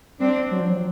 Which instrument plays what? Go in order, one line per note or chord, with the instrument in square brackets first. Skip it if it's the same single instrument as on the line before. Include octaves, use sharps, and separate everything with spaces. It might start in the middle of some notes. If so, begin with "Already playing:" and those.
[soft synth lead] G3 [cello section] C4 D4
[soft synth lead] F#3
F3
F#3